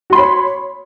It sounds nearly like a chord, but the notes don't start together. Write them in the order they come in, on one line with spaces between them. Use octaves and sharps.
F#4 C6 B5 C#5